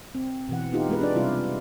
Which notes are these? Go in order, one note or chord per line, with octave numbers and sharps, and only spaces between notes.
C4
B2 E3 F#5
B3 D#4 F4 G4
G#3 B3 B4
D4 D5
C3 G3 E4 F4